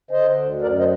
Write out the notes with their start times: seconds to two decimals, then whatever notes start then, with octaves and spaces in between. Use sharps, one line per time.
0.11 D3 C5 D#5
0.36 D2
0.61 F#2 A#4 D5
0.79 C5 D#5